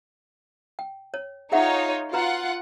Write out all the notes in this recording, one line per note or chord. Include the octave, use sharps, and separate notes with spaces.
G5
C#5
D#4 F4 G#4 C#5 E5 F#5
F4 F#4 B4 F#5 A#5